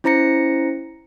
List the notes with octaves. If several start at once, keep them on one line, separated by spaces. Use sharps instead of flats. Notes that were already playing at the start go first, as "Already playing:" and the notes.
C#4 E4 C5 A#5 A#6 C#7